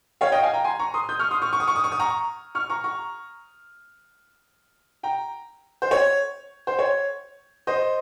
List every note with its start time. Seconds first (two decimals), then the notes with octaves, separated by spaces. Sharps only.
0.21 C#5 F5
0.32 D#5 G5
0.42 F5 G#5
0.53 G5 A#5
0.64 G#5 C6
0.79 A#5 C#6
0.94 C6 D#6
1.09 D#6 G6
1.19 C#6 F6
1.31 C6 D#6
1.42 C#6 F6
1.53 C#6
1.60 D#6
1.68 C#6
1.76 D#6
1.84 C#6
1.92 D#6
1.99 A#5 C#6
2.55 C#6 F6
2.70 A#5 C#6
2.84 A#5 C#6
5.03 G5 A#5
5.82 C5
5.91 C#5
6.67 C5
6.79 C#5
7.67 C5 D#5